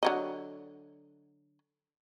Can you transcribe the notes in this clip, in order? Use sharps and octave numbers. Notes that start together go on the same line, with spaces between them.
D3 F#3 D#5